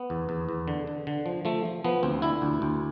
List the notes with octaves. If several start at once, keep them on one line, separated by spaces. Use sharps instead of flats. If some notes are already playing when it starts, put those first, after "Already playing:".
Already playing: B3
E2
E2
E2
D3
D3
D3
F3
F3 A3
F3
F3 B3
D2 C4
D3 E4
D2
D2